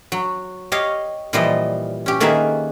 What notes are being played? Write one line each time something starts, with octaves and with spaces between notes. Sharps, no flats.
F#3
G4 C#5 D#5 F5
A#2 E3 F3 G3 C5 D#5
C#4 G4
D#3 A#3 G#4 A4 B4 E5